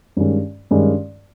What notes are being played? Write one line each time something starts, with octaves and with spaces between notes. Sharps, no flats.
G2 D#3 G#3 C#4
G2 D#3 G#3 C#4